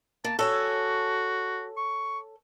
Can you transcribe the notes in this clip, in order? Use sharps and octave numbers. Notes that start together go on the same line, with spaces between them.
A#3 A5
F#4 A4 C#5 G#5
C#6